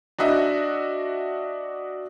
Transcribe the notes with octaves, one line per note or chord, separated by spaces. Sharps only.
D4 F#4 D#5 E5